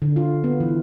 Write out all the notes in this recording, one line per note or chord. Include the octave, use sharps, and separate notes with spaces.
D3
F4
B3
E3